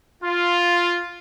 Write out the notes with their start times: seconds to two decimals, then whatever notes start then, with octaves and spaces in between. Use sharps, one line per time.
0.22 F4